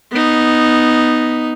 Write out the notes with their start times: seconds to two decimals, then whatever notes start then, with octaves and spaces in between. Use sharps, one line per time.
0.12 B3 D#4